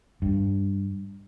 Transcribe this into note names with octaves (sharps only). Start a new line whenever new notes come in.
G2